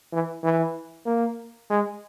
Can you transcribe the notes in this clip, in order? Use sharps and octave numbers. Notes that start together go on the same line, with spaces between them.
E3
E3
A#3
G#3